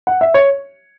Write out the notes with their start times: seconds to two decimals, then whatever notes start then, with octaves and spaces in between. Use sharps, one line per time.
0.07 F#5
0.21 E5
0.34 C#5